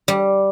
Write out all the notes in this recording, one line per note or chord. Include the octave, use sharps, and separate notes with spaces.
G3